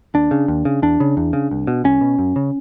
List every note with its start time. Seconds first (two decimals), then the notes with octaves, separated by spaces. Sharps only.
0.14 D#2 D4
0.31 C#3
0.48 D#2
0.65 C#3
0.82 E2 D4
1.00 C#3
1.17 E2
1.33 C#3
1.51 C2
1.67 B2
1.84 C2 C#4
2.01 B2
2.19 F#2
2.36 C#3